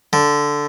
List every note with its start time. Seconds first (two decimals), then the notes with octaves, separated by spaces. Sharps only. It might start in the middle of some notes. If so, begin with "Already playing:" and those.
0.13 D3